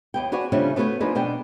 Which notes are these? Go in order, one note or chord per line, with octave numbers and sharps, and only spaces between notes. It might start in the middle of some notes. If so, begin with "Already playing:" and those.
D#2 B3 G5
F#4 G#4 B4 C#5 D5 F#5
C#3 F3 G3 A3 C#4 D4
A3 B3 F#4 G4 B4 C#5
F3 A#3 D4 D#4 G#4 B4
B2 B3 D4 G5